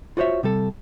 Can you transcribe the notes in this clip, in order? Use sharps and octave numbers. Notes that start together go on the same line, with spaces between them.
F4 F#4 C5 C#5 E5
C3 G3 A4